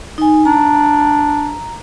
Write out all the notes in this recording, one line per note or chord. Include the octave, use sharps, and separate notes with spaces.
D#4 G#5
D4 A#5